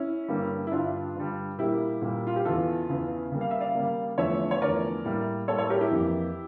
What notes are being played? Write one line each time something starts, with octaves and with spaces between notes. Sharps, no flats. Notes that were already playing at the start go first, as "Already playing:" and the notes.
Already playing: C#4 E4
G2 D3 G3 A#3
E4
G2 D3 G3 D4 F4
G2 D3 G3
A#2 G3 A#3 E4 G4
A#2 G3 A#3
F4
G4
E2 C#3 E3 F4 A4
E2 C#3 E3
C#3 G3 A#3
F5
E5
D5 F5
C#3 G3 A#3
E2 D3 F3 A3 C#5 E5
C#5
E2 D3 F3 A3 A#4 D5
A2 G3 A#3
A2 G3 A#3 A4 C#5
A4 C#5
G4 A#4
E4 G4
F2 E3 A#3